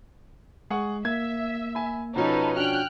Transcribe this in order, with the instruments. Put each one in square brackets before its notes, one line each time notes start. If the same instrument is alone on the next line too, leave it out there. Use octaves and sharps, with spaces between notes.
[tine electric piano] G#3 [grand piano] G#4 F#5 C#6
[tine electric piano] A#3 [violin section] E5 [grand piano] G#6
[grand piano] G#5 B5
[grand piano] B2 F3 C#4 [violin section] D#4 A4 B4
[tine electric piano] D4 F#4 [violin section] G5 F6 F#6